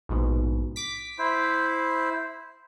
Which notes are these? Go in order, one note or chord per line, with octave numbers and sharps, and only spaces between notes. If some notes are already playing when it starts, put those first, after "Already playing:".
A#1 G#2 B2
D6 B6
E4 C5